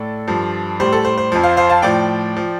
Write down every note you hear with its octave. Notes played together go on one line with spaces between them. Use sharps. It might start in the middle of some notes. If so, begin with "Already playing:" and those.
Already playing: A2 A4 D5
G2 F3
A2 G3 C5
A4
C5
C5
F2 F3
C5 F5
C5 F5
F5 A5
A2 F3 D5 G5
F3